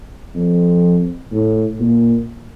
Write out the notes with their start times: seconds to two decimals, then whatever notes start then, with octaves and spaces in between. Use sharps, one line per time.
0.35 F2
1.32 A2
1.80 A#2